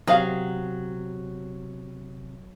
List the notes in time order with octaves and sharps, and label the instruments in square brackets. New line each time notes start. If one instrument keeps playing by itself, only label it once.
[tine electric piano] C3 C4 [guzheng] F#3 [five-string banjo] G#4 F5